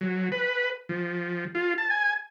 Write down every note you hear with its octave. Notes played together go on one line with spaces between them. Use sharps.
F#3
B4
F3
F4
A5
G#5